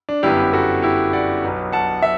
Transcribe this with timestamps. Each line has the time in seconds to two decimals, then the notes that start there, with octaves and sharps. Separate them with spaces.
0.09 D4
0.23 G1 F#2 F#3 B3 E4 G4
0.53 F#4 A4
0.82 E4 G4
1.13 D5 F#5
1.43 B1 B2 F#3 B3
1.72 F#5 A5
2.02 E5